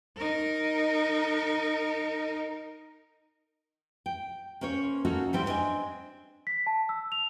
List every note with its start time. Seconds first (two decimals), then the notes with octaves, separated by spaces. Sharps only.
0.16 D#4 A#4
4.06 G5
4.61 A#3 C#4 C5 C#5
5.05 A#3 C#4 D#4 F#4 A4
5.33 G#2 G3 C4 E4 D5
5.46 B3 C4 D4 D#5 G#5
6.47 B6
6.67 A5
6.89 E6
7.12 F7